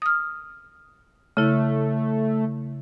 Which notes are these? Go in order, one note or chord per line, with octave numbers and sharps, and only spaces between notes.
D#6 F6
C#3 A3 E4